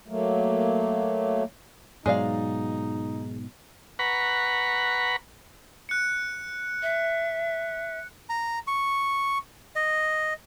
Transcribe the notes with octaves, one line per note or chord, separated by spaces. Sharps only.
F#3 A3 A#3
G#2 B2 F#3 G#3 D#4 D5 F5
B4 F#5 A#5 B5 C#6
F#6 C#7
E5
A#5
C#6
D#5